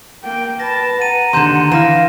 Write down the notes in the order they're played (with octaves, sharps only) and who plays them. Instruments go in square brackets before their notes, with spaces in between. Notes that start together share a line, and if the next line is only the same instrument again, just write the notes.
[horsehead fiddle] A#3 G5
[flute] B4 [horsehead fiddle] A5 [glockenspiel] A#6
[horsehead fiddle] F#5 [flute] A#5 [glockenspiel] D#7
[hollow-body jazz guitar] D#2 D3 [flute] A#5 [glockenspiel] C6 G6 E7
[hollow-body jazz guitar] E3 [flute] F5 [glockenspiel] F6 A#6 E7